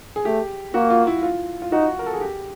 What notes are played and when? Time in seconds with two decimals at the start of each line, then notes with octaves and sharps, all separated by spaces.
0.16 G#4
0.25 A3 G4
0.74 A#3 F#4
0.90 F4
1.07 E4
1.23 F4
1.62 F4
1.72 D#4 F#4
1.99 A#4
2.06 A4
2.13 G#4
2.21 G4